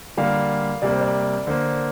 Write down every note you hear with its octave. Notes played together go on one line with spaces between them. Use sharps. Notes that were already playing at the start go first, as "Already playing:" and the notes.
D3 G3 A#3 F5
C3 G3 A#3 D5
C5
D5
D3 A#3 C5